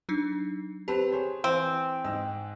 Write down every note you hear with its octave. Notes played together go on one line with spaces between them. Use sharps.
F#3 D4 D#4
C4 G4 B4 A5
G#4 C5 C#5
E3 C4 D7
G#2 D#5 E6